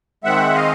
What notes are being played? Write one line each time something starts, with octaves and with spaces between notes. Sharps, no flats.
D#3 G#3 C4 E5 F#5
D#5 F5